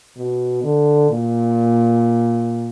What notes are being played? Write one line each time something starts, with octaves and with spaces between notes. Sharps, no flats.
B2
D3
A#2